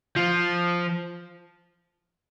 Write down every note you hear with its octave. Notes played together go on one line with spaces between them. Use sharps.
F3